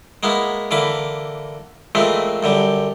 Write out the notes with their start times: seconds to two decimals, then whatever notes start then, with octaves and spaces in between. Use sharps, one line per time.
0.23 G#3 A#3 B3 E4
0.71 D3 E3 A#3 B5 D6
1.95 A#2 E3 G#3 A3 C4
2.43 F#2 D3 G3